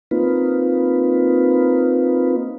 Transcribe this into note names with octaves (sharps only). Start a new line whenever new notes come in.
A#3 C4 D#4 F4 B4